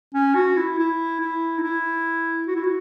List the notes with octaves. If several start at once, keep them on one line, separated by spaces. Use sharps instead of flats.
C#4
F#4
E4
E4
E4
D#4
E4
F#4
E4
F#4